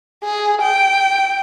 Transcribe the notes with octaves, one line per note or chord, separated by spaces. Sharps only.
G#4
G5